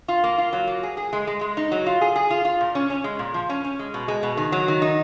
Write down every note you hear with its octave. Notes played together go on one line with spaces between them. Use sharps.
F4
A#3
F4
F#3
A#3
G#4
G#4
G#3
G#3
G#3
D#4
F#3
F4
G#4
G#4
F4
F4
A#2
C#4
C#4
G#3
A#2
F3
C#4
C#4
G#3
B2
G#3
B2
D#3
F#3
D#3
D#4